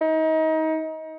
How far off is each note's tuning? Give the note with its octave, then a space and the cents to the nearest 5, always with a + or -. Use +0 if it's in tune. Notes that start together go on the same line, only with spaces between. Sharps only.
D#4 +30